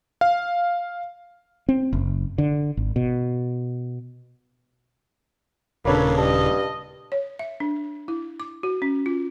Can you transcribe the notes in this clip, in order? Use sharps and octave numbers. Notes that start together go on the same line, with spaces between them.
F5
C4
F#1
D3
G#1
B2
D#1 C#3 A#3 D4 A4 B4 C#5 B5
G2 D#5 A5
C#5
E5
D4
E4
D6
F#4
C#4
F4